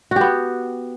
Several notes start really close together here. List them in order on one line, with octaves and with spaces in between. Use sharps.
F#4 G4 B3